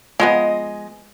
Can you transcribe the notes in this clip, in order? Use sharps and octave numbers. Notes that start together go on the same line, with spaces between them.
F3 G#3 A#3 B3 D#5